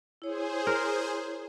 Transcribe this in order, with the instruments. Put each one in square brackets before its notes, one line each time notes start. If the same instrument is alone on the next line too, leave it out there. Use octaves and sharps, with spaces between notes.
[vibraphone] E4 C#5 [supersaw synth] G#4 C5
[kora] A#4